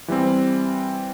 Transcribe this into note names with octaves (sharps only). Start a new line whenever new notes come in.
E3 G3 C4